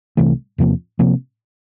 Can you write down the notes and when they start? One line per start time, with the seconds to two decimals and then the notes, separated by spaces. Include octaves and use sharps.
0.17 C2 C3 E3 A3
0.58 E2 C3 F3 A#3
0.99 C3 F3 A#3